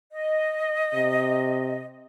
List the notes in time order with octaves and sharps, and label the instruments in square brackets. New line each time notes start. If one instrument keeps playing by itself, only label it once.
[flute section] D#5
[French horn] C3